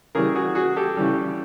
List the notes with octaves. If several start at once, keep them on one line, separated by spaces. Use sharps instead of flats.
C#3 E3 G3 G#4 A#4
F#4 G#4
F#4 G#4
G4 A4
C#3 E3 G3